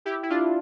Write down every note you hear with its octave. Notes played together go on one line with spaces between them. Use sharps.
E4 G4
E4
D4 F4